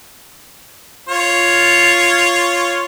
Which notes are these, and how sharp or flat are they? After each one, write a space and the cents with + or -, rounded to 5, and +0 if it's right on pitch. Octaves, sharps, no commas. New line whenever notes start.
F4 +0 C#5 +0